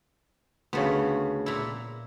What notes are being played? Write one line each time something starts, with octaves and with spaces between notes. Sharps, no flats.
D2 C#3 A3 B3
A#2 E4